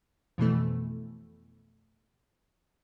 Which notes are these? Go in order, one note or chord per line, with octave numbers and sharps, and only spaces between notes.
F2 B2 E3 A3